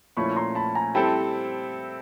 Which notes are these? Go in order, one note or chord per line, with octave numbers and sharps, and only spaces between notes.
A#2 F3 A3 C#4 E4 B5 C#6
A#5 C6
A5 B5
G#5 A#5
G3 C4 E4 A4 C5 A5 B5